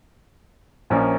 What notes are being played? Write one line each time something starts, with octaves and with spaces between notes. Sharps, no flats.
A#1 A#2 F3 A#3 C#4